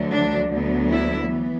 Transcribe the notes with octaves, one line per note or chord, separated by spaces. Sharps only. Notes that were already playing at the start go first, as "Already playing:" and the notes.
Already playing: D2 D3 F#3
D4
D2 D3 F#3 B3
E4
E3 B3